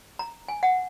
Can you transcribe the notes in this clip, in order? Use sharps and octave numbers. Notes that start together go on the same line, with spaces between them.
A#5
G#5
F#5